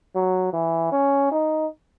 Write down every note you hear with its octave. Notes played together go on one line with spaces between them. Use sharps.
F#3
E3
C#4
D#4